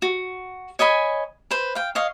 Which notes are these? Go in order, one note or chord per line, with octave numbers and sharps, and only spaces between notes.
F#4
C#5 D#5 G#5 B5
B4 C5
F5 G5
C#5 D#5 F5